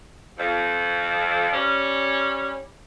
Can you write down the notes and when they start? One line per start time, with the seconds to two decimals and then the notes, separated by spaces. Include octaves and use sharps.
0.38 F2
1.53 G3 C#4